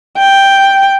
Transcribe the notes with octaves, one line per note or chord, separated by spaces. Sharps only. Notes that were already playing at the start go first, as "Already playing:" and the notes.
G5